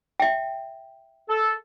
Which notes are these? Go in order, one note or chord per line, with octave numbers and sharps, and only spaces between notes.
E5 G5
A4